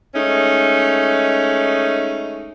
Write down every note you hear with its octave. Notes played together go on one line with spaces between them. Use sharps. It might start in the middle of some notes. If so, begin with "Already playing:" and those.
G#3 A3 C#4 D#4